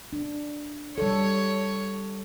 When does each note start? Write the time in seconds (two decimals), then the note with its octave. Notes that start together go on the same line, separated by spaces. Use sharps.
0.13 D4
0.98 G3 A4 C#5